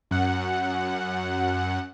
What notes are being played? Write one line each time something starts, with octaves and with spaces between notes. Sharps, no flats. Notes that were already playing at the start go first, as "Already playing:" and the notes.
F#2 F#5